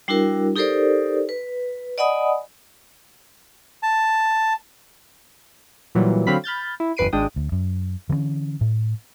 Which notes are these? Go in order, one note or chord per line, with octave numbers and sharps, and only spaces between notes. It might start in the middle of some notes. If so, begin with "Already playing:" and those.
G3 D4 E4 F#4 A#4
D#4 G4 A4 A#4 C5 D5
B4
D5 D#5 F#5 G#5 B5 D#6
A5
A#2 E3 F#3 G3
D3 F#3 C4 F5 B5 B6
B5 F6 G6 A6
E4
G1 F2 B4 C7 D7 D#7
G#1 G#3 D4 G5 D#6
D2
F#2
D3 E3 G#3 C#4
A2